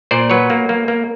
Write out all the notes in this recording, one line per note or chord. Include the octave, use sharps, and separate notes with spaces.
A#2 C5 D5
F#3 B4 C#5
A#3
A#3
A#3